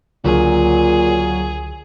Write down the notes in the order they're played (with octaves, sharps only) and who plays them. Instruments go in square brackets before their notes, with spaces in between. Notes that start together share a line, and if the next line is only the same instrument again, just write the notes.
[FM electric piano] C#2 D3 [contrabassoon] A#2 [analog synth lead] F#3 [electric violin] G#4